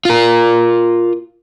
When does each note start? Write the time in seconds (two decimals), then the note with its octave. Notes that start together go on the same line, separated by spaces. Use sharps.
0.05 F4 A#4